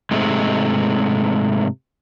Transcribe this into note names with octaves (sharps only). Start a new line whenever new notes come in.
G#2 C3 G#3 A3